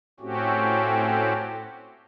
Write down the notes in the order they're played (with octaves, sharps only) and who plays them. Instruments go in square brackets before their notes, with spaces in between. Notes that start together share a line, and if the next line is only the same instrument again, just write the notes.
[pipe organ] A2 A3 C4 C#4 F#4 G4